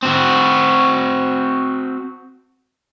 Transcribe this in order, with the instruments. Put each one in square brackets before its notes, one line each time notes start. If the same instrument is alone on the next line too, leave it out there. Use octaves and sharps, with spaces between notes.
[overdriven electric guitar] C4 F#4